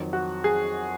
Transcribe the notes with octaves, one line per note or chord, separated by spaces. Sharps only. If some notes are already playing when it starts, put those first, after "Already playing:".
Already playing: F2 D#3 F#3
F#4
G#4